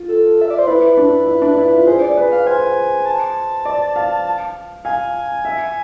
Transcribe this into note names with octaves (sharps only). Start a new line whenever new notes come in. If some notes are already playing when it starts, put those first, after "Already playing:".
Already playing: F4
A4
E5
D5
C5
E4 B4
D4
E4
D4
E4
F4
G#4 C5
D5
B4
F5
C5 G#5
A5
D5
F5
F5 G#5
E5